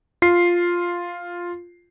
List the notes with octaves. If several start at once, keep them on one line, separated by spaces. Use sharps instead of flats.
F4 C7